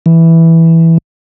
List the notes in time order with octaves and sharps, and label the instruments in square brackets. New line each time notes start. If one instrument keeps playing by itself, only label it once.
[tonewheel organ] E3